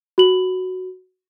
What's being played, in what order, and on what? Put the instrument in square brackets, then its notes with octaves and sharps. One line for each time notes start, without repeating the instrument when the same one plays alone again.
[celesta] F#4 F#7